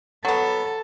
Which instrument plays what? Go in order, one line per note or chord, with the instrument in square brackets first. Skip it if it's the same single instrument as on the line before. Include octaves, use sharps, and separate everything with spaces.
[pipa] F#3 B3 [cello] A4